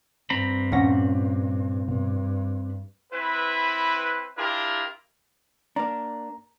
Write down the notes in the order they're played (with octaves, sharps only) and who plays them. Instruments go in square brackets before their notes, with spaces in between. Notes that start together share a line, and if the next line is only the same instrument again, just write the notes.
[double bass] G2 [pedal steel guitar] C4 A#5 B5
[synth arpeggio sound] D#2 A#6 [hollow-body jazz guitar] A#2 C#4 F#5
[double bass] G2 [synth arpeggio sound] B2
[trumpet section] C4 E4 B4
D4 E4 F4 G4 A#4
[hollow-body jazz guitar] A#3 D4 [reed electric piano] A#5